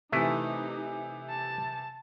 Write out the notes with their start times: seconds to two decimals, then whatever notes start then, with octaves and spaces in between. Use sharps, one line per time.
0.12 C3 E3 A3 D#4 E4 B4
1.29 A5